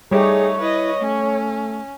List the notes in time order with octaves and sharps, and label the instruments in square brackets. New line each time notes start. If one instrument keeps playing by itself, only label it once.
[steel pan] G3 G4 [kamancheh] A3 D#4 [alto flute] G#4 [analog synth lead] C#5
[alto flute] E4 [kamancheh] B4 D#5
[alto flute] A3 [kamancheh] C#4